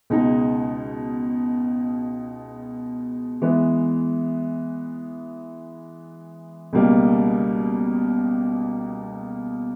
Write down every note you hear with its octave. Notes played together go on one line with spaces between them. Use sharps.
C#2 B2 G#3 D#4
E3 G#3 B3
C#2 B2 G3 A#3